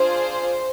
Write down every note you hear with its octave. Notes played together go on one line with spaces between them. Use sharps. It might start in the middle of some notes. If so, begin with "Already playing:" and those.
Already playing: D4 F4 G#4 C5